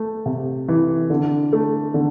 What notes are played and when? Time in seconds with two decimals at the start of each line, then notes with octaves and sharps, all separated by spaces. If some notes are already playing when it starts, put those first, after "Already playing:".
Already playing: A3
0.26 C3
0.68 E3
1.10 D3
1.53 A3
1.94 D3